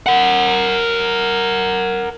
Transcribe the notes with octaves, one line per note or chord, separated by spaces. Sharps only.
A#4 F#5